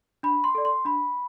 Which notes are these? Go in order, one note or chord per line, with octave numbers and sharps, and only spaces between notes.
D4 B5
C6
A4 D5
C6
D4 B5